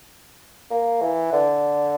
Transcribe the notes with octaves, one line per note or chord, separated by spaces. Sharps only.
A#3
E3
D3